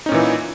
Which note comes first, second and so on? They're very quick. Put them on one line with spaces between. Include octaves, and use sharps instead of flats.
D#4 C#4 A#2 E3